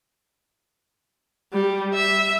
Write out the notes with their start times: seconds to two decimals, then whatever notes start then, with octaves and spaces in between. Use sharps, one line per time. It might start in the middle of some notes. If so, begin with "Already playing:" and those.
1.53 G3
1.94 E5